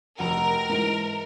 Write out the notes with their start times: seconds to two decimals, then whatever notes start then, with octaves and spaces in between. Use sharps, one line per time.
0.19 F1 F#4 A#4
0.69 G#2 E3 D7